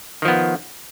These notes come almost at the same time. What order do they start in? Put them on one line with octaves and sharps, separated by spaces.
D#3 F3 B3